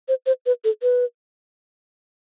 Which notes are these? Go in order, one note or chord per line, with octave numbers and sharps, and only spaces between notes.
C5
C5
B4
A4
B4